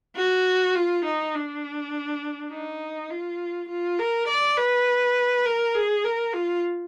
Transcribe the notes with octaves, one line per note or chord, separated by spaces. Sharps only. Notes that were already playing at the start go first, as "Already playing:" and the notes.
F#4
F4
D#4
D4
D#4
F4
F4
A#4
D5
B4
A#4
G#4
A#4
F4